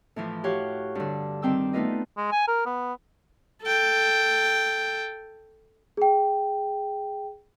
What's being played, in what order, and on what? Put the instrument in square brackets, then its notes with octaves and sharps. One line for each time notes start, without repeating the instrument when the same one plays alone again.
[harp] A2 E3 F3
F#4 G4 C#5 F5 F#5
G2 D3
D#3 G3 C4 G5 D6 E6
A3 B3 D#4 F4 B4 D#5
[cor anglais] G#3
G#5
A#4
B3
[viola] A4 G5
[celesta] G#4 G5